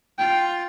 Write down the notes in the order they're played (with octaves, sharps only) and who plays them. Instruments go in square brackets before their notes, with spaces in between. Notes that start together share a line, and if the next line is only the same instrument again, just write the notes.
[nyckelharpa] F4 [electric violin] G5